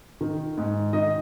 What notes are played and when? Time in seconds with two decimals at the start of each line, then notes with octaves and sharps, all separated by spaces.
0.21 D#3
0.57 G#2
0.93 D#3 D#5